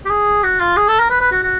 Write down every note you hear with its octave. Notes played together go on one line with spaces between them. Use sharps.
G4
G#4
F#4
F4
G#4
A4
A#4
B4
B4
F#4
F#4